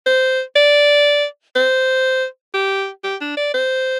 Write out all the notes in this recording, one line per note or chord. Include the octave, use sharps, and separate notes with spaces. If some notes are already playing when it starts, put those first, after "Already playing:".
C5
D5
C5
G4
G4
D4
D5
C5